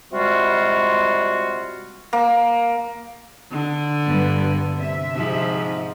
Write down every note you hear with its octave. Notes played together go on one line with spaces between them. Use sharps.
C3 G3 G#3 F4 F#4
A#3
D3
G2 B3
C3 E5
G#2 F3